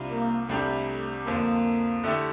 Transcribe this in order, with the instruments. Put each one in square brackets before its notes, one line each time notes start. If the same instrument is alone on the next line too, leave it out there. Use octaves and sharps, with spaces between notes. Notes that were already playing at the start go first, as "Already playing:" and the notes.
Already playing: [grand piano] C2 C3 G3 D4 F4
[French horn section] A#3
[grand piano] C2 C3 G3 D4 G4 [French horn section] A3
[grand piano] F2 D3 F3 [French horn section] A#3
[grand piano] D3 A3 E4 G4